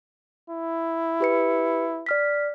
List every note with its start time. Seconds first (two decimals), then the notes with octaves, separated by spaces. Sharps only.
0.50 E4
1.20 G4 B4 C#7
2.06 D5 F6 B6